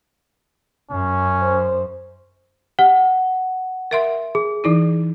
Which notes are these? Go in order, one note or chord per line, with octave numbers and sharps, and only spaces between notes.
F#2 C#4
C5
G4 F#5
A#4 E5 C6
G#4
E3 D#4 E4